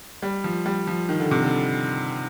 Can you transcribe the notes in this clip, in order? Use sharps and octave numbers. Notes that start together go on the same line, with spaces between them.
G3
F3
G3
F3
D#3
D3
C3
D3